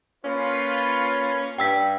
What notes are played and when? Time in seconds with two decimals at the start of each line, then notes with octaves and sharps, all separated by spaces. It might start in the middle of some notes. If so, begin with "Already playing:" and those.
0.25 A#3 C#4 F4 B4
1.58 G2 G5 E6 B6